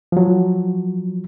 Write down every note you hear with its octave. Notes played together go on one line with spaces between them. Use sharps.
F3 F#3